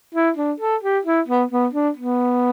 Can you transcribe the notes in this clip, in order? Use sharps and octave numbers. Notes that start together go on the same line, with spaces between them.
E4
D4
A4
G4
E4
B3
B3
D4
B3